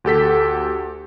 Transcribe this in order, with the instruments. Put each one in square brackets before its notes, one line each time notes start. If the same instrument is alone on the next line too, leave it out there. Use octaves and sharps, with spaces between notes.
[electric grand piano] D2 G4 A4 B6